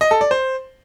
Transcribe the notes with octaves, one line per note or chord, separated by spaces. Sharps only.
D#5
A4
D5
C5